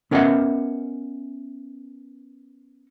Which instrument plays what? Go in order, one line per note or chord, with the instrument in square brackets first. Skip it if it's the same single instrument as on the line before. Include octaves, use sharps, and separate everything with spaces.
[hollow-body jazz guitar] B3 C#4 A#4 D#5 E5 F#5